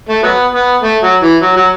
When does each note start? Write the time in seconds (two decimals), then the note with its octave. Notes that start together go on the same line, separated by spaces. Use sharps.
0.09 A3
0.23 F#3 B3
0.53 B3
0.83 A3
1.02 F#3
1.22 E3
1.42 F#3
1.57 F#3